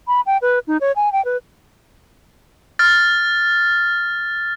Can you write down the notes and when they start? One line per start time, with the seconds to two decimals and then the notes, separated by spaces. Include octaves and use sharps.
0.08 B5
0.26 G5
0.42 B4
0.67 D#4
0.81 C#5
0.96 G#5
1.12 G5
1.25 B4
2.79 F6 A6